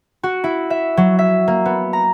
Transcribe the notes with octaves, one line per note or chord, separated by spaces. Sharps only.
F#4
E4
E5
F#3
E5
A#3
B3
A#5